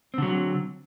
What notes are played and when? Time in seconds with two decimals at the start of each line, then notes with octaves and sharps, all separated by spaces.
0.14 C4
0.18 D3
0.22 F#3